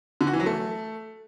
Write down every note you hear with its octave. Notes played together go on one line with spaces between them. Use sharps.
D3
F#4
E3
F#3
A3